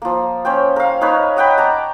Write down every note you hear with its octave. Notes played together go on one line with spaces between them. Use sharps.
F3 A#3
C#4 C5 G5
A#4 F5
D#4 A#4 B4 C#5
D#5 F#5 G5 B5
A5 A#5 D6